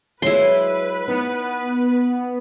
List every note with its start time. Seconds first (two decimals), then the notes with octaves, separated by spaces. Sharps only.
0.22 F#3 G#3 E4 B4 C6
1.08 B3 D#4